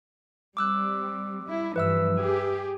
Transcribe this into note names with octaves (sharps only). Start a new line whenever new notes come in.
G3 C4 D6 E6 F#6
G3 E4
G2 E3 F3 B4 E5 E6
G4 G#4